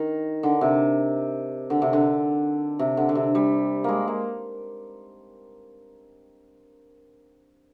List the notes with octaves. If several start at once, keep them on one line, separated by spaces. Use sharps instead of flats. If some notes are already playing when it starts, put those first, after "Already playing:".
Already playing: D#3
D3
C3
D3
C3
D3
C3
D3
D3
C3
G3
G#3 A#3
A#3